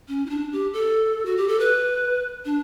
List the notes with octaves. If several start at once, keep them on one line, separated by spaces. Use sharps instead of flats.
C#4
E4
D4
G4
A4
F#4
G4
A4
B4
D4